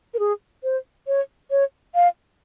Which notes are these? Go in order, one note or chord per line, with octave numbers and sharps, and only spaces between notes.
A#4
G#4
C5
C#5
C#5
F5